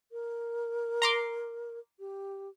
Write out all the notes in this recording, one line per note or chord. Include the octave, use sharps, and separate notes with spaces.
A#4
A#5 C6 D6
G4